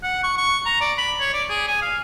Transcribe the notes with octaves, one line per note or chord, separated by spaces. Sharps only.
F#5
C#6
C#6
A#5
D5
B5
C#5
D5
G#4
G#5
F5